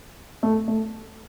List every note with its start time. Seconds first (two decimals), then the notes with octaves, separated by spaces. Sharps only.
0.43 A3
0.68 A3